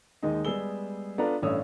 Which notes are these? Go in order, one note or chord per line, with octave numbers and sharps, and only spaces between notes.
D#2 G#3 D#4
G3 G#3 B3 G#4 E6 G7
B3 D4 F4 A4 D5 A#5
A1 G2 A3 C#5 D#6 E6